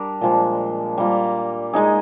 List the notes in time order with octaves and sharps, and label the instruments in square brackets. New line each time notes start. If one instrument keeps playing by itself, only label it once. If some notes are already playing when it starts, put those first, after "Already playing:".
Already playing: [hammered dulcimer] G3 D4 G4 A#4
A#2 F3 G#3
G3 A#3 F4
G#3 D#4 G#4